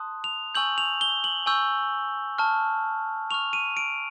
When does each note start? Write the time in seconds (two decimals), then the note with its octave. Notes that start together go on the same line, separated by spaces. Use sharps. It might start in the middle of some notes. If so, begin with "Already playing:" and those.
Already playing: A5 C6 D#6 F#6
0.24 F7
0.55 G#5 C#6 E6 G6 F#7
0.78 F7
1.01 G7
1.24 F#7
1.46 G#5 C#6 E6 G6
2.38 A5 C#6 F6
3.30 A5 C#6 F6 F7
3.53 D#7
3.77 D7